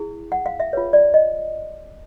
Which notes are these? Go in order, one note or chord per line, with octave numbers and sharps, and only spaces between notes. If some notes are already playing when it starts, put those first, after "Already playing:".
Already playing: E4 G#4
F#5
F5
E5
F4 G#4 B4 C#5
D5
D#5